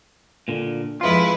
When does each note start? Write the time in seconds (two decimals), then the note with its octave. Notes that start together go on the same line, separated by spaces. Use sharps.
0.48 A#2 D3
1.01 F2 G#3 E4 F4 B4